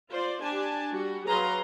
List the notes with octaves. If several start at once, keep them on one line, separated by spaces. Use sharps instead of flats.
F4 C5 D5
D4 G4 G#5 A5
G3 F#4
F#3 G#4 B4 F5 A#5 C6